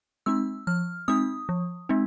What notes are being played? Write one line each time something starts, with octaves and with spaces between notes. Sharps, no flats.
G#3 C4 D#4 E6
F3 F6
G#3 C4 D#4 D#6
F3
G#3 C4 D#4